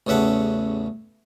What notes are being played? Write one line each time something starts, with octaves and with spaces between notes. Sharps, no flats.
A1 E2 C#3 E5 F#5 A5